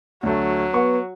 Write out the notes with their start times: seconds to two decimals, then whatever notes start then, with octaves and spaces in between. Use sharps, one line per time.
0.23 D2 F#3 A3
0.74 B3 C#6